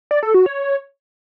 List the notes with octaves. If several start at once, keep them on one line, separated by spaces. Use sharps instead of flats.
D5
A4
F#4
C#5